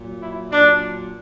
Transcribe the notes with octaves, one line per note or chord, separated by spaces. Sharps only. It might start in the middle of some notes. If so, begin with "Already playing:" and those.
Already playing: A#2 F#3
E4
A#2 F#3 D4